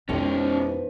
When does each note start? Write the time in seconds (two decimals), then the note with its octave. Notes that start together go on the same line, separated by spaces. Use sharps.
0.09 E1 F2 D#3 F3 G#3 C#4 D#4
0.61 B4